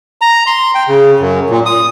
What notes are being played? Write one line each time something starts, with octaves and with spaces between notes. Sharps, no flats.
A#5
C6
G5
C#3
F#2
A#2
D#6